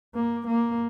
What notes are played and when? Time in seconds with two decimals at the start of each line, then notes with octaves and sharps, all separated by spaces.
0.15 A#3
0.47 A#3